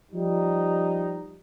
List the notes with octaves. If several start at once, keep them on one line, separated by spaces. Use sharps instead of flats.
F3 G3 D#4